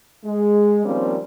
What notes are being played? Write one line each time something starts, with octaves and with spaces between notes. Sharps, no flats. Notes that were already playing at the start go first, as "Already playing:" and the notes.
G#3
D#3 F3 G3 A#3 C4 C#4